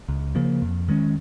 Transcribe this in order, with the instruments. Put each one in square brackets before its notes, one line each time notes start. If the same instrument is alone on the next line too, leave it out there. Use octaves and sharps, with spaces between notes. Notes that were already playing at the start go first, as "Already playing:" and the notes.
[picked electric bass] C#2
C#3 F3 A#3
F2
D#3 G#3 C#4